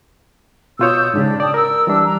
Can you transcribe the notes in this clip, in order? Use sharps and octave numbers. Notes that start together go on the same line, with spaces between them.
B2 F4 C#5 D#6 E6 G6
G#2 C#3 D4 G4 G#4
D5 G5 A5 D#6
A#4 E6
E3 G3 D4
A#5